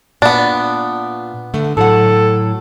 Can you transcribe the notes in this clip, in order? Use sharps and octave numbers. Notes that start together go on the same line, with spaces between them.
A#2 B3 D4
D3 A3
A2 F#3 A4 F#5